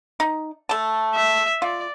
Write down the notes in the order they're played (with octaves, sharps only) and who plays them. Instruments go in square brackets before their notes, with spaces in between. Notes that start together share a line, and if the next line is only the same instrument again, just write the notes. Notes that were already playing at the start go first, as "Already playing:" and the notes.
[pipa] D#4
A3 A5
[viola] E5
[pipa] F4 [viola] D5